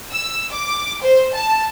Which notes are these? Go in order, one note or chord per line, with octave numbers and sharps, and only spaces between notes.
E6
D6
C5
A5